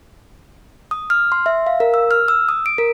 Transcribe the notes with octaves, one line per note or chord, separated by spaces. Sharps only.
D#6
F6
C6
E5
F5
A#4
E6
F6
E6
D#6
D7
A#4